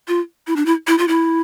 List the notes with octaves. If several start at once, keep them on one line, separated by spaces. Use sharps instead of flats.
F4
E4
D4
E4
E4
F4
E4